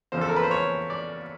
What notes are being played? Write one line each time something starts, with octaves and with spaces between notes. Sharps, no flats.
E2 C#3 F3 C5
A4
A#4
B4
C5
C#5
D5